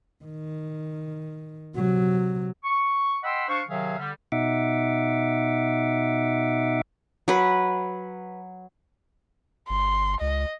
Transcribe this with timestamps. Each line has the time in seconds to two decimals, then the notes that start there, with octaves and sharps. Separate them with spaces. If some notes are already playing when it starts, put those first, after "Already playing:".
0.24 D#3
1.75 C3 F#3
2.64 C#6
3.24 D#5 F#5 G5 B5 C6 E6
3.48 D4 C5 F5 C#6
3.69 C3 D#3 F#3 G#4 E5 F5
3.98 D3 G3
4.32 B2 D#4 E5 F#5 D6
7.28 F#3 B4
9.70 G1 C6
10.21 C#2 D#5